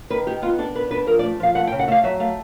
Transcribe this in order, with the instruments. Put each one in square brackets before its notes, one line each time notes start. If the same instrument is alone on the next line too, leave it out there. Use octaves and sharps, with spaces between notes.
[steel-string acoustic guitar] D#3 B4
D#3 G4
B3 F4
D4 A4
B3 B4
D4 B4
F3 A#4
D5
A3
F3 F5
A3 F#5
G5
C#3
F#5
A3 E5
F5
F#3 E5
A3 F5